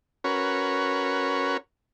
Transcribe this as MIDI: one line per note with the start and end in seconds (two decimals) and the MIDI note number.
0.24 1.57 61
0.24 1.57 66
0.24 1.57 70
0.24 1.57 71
0.24 1.57 73